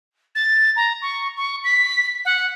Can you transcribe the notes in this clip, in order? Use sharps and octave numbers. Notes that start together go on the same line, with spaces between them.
A6
A#5
C#6
C#6
B6
F#5